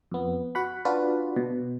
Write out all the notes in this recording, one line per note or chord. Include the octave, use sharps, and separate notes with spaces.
F2 B3
F#4 F#5 B5
D4 F4 F#4 B4 D5
B2